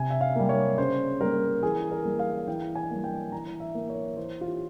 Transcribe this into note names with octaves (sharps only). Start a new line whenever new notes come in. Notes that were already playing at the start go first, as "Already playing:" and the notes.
Already playing: C3 G#5
E5
F5
G3 A#3
C#5
C#3 C5
G3 A#3 A#4
E3 G#4
A#4
G3 A#3
F5
E3 G5
G#5
G3 A#3
G5
E3 A#5
E5
A#3
C#5
E3 C5
F4
G4